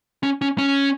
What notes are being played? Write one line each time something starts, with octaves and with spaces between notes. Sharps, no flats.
C#4
C#4
C#4